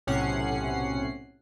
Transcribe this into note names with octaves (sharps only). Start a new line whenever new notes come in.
B1 A2 C3 C#4 F#5 C7